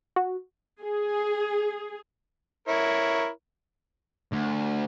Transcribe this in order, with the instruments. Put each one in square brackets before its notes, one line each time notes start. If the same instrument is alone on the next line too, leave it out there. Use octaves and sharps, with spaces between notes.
[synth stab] F#4
[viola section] G#4
[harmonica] E4 A#4 C#5
[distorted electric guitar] D2